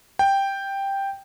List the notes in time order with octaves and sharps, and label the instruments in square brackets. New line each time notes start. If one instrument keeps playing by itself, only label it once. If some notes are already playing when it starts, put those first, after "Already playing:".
[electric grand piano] G5